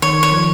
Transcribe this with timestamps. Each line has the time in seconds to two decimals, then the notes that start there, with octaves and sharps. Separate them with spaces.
0.02 D#3 C#5
0.23 C#5
0.32 F3